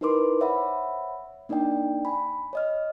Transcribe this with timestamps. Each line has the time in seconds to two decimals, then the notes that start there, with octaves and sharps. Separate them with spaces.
0.01 D#4 E4 A#4 B4 C6 D6
0.40 C5 C#5 E5 F#5 B5
1.49 A#3 D4 D#4 D5 G5
2.05 G#5 B5
2.53 C#5 D#5 F6